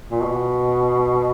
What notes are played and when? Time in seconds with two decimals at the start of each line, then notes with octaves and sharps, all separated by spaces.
0.11 A#2
0.23 B2